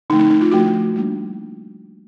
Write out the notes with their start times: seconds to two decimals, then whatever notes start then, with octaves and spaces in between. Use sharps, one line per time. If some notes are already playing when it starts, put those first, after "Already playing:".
0.10 D3 F3 A3 C4 D#4
0.20 D#4
0.30 D#4
0.41 F4
0.51 F3 A3 D4 F#4
0.95 G3 A#3 D4